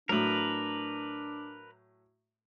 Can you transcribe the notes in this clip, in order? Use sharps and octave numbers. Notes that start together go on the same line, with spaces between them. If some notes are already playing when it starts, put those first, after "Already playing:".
A2 F#3 D4 A#4 B4